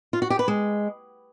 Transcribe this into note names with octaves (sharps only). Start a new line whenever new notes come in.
F4
F#4
G4
B4
G#3